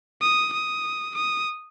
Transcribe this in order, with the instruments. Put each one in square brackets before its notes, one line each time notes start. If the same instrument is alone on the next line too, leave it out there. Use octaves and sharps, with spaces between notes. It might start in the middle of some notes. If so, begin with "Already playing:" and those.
[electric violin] D#6
D#6
D#6